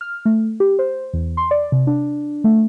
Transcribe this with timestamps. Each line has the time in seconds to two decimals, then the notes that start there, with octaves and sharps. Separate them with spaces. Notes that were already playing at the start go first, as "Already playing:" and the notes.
0.01 F6
0.25 A3
0.60 G4
0.79 C5
1.13 E2
1.37 C6
1.51 D5
1.72 C3
1.87 D4
2.44 A3